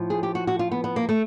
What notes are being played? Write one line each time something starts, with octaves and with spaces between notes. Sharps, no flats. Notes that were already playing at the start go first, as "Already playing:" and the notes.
Already playing: A2 F3
G#4
G4
F#4
F#4
F4
B3
B3
A#3
A3